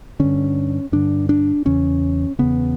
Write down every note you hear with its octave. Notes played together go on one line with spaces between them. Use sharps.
G2 D3 C#4
G2 D3 D4
D4
E2 C#3 C#4
E2 C#3 B3